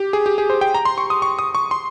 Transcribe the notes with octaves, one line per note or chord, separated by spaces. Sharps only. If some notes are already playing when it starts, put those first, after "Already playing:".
Already playing: G4
G#4
G4
G#4
C5
G5
A#5
C6
C#6
D#6
C#6
D#6
C#6
C6